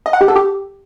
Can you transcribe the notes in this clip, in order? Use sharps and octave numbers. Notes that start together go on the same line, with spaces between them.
D#5
F#5
G4
A4
G4